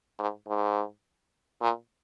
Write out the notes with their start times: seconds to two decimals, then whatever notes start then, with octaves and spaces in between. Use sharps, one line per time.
0.19 G#2
0.48 G#2
1.62 A#2